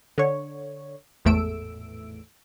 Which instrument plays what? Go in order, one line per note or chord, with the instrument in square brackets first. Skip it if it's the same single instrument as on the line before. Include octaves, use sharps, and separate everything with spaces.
[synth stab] D3 C#5
G#1 E2 A2 A3 E6 D7